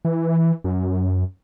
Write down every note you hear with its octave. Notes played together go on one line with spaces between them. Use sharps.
E3
F#2